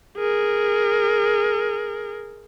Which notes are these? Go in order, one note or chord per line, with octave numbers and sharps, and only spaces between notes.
G#4 A#4